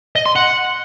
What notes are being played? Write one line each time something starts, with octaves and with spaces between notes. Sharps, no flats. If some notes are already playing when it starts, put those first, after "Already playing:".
D#5
C6
F#5